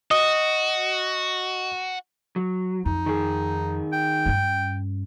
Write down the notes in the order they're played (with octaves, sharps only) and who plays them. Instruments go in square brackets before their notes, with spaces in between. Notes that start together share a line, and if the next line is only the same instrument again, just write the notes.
[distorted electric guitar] F#4 [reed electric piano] D#5 D#6
[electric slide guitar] F#3
[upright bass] F2 [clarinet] D#4
[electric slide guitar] D#3 G#4
[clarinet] G5
[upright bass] G2 C#4